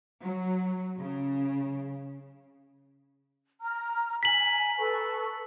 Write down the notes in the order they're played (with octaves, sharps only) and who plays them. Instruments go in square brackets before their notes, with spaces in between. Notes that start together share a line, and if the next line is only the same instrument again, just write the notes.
[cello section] F#3
C#3
[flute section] A#5 F6
[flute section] G#5 A#5 [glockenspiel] B6 F#7
[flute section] A4 B4 C#6